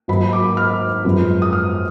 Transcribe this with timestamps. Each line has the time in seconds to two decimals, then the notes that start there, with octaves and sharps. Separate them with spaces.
0.08 G#1 G#2 F#3 A#3 D#4 B5
0.29 B5
0.33 D6
0.57 F6
1.05 G#1 F#2 F3 G#3 B3
1.42 D#6
1.53 F6